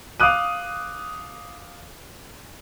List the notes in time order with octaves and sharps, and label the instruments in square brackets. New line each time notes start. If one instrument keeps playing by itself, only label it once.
[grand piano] F5 D6 D#6 F#6 D#7